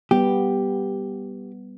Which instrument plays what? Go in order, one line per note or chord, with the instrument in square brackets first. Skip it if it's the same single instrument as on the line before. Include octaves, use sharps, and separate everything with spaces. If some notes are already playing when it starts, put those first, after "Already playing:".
[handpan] G3 B3 [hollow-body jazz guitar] G4